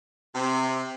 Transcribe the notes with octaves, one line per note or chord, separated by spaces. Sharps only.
C3